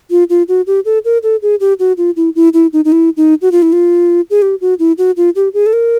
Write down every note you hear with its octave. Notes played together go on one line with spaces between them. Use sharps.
F4
F4
F#4
G4
A4
A#4
A4
G#4
G4
F#4
F4
E4
E4
E4
D#4
D#4
E4
D#4
F#4
F4
E4
F4
G#4
G4
F#4
E4
F#4
F4
G4
G#4
A4
A#4